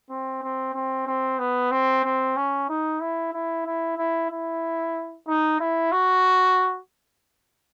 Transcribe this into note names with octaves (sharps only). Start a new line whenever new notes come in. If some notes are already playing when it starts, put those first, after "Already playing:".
C4
C4
C4
C4
B3
C4
C4
C#4
D#4
E4
E4
E4
E4
E4
D#4
E4
F#4